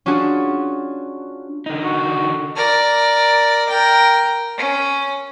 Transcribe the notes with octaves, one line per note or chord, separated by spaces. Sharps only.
C#4 D4 F4 F#4 G#4
D3 D#4
F#4
A#4 D5
A#4 G5
C#4